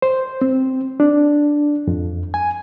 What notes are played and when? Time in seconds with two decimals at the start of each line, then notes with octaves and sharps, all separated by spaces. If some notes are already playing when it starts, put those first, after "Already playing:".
0.02 C5
0.42 C4
1.00 D4
1.87 F2
2.34 G#5